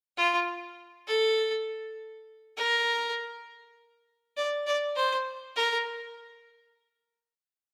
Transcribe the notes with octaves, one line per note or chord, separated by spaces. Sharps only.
F4
A4
A#4
D5
D5
C5
A#4